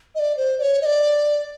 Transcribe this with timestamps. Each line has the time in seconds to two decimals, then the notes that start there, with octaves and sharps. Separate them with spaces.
0.15 D#5
0.19 D5
0.37 C5
0.59 D5
0.62 C#5
0.82 D#5
0.86 D5